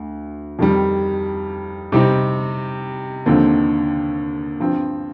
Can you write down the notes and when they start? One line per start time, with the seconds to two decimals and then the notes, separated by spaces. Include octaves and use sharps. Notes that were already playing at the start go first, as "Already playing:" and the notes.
Already playing: D2
0.59 F2 D#3 G3
1.92 C3 G3 C4 D#4
3.26 D#2 D3 F3 C4 D#4
4.60 G2 F3 C4